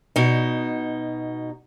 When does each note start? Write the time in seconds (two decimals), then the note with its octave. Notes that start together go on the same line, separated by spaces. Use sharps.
0.16 B2 D#4